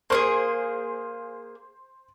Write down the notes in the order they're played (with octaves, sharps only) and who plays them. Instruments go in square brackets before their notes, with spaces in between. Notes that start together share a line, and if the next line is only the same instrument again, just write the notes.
[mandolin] A#3 D4 G#4 [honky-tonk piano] C5 C6